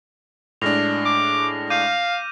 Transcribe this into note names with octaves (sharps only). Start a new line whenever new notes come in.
A2 G#3 D4 F6 A#6 F7
D6
F5 D6 G6 D#7